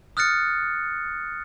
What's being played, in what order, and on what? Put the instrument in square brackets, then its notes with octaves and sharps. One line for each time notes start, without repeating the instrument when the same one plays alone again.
[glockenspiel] D#6 F6 F#6 A6 C#7